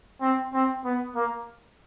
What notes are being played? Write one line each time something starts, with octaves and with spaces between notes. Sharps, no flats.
C4
C4
B3
A#3